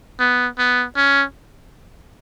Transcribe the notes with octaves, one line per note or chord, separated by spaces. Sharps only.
B3
B3
C#4